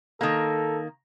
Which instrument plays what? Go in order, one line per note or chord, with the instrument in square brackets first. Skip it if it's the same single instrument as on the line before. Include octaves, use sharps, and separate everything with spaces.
[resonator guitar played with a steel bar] D#3 A#3 [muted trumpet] A4